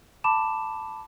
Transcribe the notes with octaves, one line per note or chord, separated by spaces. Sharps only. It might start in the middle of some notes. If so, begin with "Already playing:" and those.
A5 B5 D6 E7